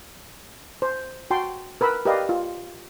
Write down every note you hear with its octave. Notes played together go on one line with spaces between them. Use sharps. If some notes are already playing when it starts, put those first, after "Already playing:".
C5
F#4 G5 A5 C6
A#4 B4 B5 E6
G4 A#4 B4 D5 D#5 F5
F4